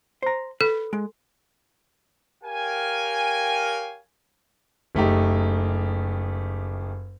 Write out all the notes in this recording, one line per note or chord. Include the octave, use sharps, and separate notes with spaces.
C5 A#5
A4 B4
G#3
G4 A#4 C#5 F5 G5 G#5
F#1 A3 D#4 G4